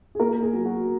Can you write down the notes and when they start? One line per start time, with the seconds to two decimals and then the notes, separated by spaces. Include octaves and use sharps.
0.15 G#4
0.20 A#3 A#4
0.42 G#4
0.53 F#3
0.65 F#4